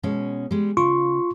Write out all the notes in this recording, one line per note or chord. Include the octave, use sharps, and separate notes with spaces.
B2 G#3 C#4
G3 G#3
C#3 F4 C6 C#6